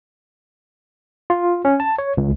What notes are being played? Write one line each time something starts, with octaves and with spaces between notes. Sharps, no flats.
F4
C#4
A5
C#5
C#2